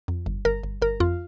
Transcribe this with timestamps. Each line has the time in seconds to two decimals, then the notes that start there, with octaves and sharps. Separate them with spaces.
0.08 F2
0.26 G1
0.45 G1 A#4
0.63 G1
0.82 G1 A#4
1.00 F2 F4